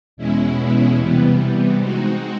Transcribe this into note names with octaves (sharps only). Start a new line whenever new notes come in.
E2 B2 G#3 C#4 E4
C3 E3 G3 B3
G#3 C4 D#4 F#4